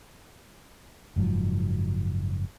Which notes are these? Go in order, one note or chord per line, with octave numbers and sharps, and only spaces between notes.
F#1 G#2 F3 F#3